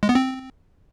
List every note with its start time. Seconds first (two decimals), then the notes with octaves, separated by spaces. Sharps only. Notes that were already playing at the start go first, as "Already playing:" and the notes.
0.03 G#3
0.09 B3
0.15 C4